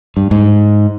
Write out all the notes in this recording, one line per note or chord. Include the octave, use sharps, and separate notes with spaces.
G2
G#2